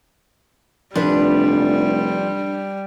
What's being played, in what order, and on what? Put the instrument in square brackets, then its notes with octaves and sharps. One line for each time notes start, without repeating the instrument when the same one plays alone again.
[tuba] F1 [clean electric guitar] F3 [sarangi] G3 [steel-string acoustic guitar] D4 B4